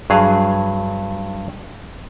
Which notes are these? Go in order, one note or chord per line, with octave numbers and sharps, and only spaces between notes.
G2 F#3 G#4 F5